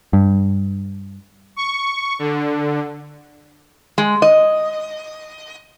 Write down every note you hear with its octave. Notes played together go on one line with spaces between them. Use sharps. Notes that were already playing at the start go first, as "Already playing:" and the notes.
G2
C#6
D3
G#3
D#5